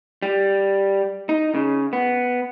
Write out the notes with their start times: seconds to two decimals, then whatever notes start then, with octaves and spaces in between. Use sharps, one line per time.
0.22 G3
1.29 D#4
1.55 C#3
1.93 B3